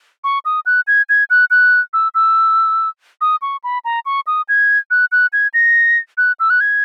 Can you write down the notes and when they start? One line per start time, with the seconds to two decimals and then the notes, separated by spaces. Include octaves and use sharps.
0.24 C#6
0.45 D#6
0.66 F#6
0.87 G#6
1.09 G#6
1.30 F#6
1.51 F#6
1.93 E6
2.15 E6
3.21 D#6
3.42 C#6
3.64 B5
3.85 A#5
4.06 C#6
4.27 D#6
4.49 G#6
4.91 F#6
5.12 F#6
5.33 G#6
5.54 A#6
6.18 F#6
6.40 E6
6.50 F#6
6.61 G#6